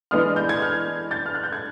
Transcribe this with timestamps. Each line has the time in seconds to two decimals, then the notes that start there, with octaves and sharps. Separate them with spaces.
0.11 E3 G#3 B3 D4 D#6 F6
0.36 G6
0.49 G#6
0.62 F6 G6
1.11 G6 A6
1.26 F6
1.35 F#6
1.44 G6
1.52 G#6